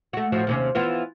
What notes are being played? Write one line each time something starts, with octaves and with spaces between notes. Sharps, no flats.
A3 F#4
A2 F3 F#4
D#2 C3 C#4
E3 B3 F4